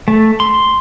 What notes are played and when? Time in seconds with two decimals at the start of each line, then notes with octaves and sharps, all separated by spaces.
0.08 A3
0.40 C6